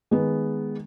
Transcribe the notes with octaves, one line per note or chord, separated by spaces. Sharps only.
D#3 G#3 B3